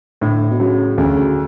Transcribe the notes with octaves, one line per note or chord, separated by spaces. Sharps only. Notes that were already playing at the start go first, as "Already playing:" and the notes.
A2 D3
B2
C#3 F#3
D2 C#3